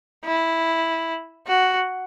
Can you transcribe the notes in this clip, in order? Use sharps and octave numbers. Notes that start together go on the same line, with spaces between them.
E4
F#4